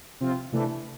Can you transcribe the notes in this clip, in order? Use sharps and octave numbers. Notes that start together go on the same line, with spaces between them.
C3 F3 C4 F4
C3 E3 A3 D4